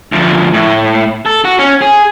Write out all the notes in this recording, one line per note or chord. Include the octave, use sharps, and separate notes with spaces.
D2 F3
A2
A4
F#4
C#4
G#4